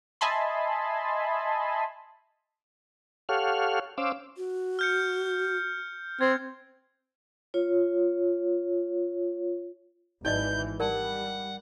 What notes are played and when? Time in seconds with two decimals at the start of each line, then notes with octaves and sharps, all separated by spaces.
0.21 D#5 E5 G#5 A5 B5 C6
3.29 G4 A4 C#5 F5 F#5 F6
3.98 C#4 C5 F5 D6 E6
4.37 F#4
4.79 F6 G6 C#7
6.21 C4 G#6
7.54 F4 C#5
10.25 G#1 E3 D#4 D5 D#5 G6
10.80 G3 A#4 D5 F#5 A5